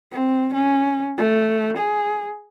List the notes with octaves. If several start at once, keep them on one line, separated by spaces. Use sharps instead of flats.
C4
C#4
A3
G#4